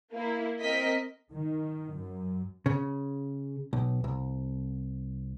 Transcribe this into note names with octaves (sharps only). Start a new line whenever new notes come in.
A#3 E4
C4 A#4 D#5 B6
D#3
F#2
C#3
B1
C2